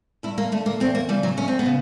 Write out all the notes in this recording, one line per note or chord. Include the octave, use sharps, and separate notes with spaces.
G2 E4
A#3
D3 A3
A#3
E2 C4
A#3
C#3 E3 G3
F#3
F#2 C#4
C4
B3
C#3